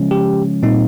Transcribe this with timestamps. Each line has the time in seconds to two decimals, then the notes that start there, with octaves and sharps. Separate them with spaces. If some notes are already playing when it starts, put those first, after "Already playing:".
Already playing: C#3 F3 G#3 C#4
0.11 G4
0.63 A#2 G3 C4 D#4